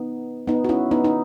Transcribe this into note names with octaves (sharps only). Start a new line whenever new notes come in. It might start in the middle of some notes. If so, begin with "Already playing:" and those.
Already playing: B3 D#4
B3 D#4
F#4
C#4 E4
B3 D#4
D#4